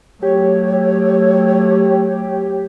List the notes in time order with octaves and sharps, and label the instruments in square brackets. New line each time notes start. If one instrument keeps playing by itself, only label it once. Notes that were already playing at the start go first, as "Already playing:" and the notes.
[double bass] F#3 A3 [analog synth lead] G4 [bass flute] C#5